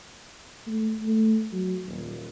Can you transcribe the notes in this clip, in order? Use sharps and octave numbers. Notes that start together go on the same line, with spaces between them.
A3
A3
F#3
D#1